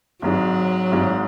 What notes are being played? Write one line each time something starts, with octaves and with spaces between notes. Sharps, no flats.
G#1 G#2 F#3 G#3
G#1 G#2 G#3